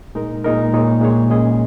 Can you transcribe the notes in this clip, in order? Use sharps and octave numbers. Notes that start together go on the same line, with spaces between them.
A#2 G#3 D#4 A#4
A#2 G#3 D#4 A#4
A#2 G#3 D#4 G#4 C#5
A#2 G#3 D#4 G#4 C#5
A#2 G#3 C#4 G#4 D#5